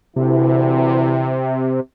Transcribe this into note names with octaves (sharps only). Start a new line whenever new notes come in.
D2 C3 E3 E4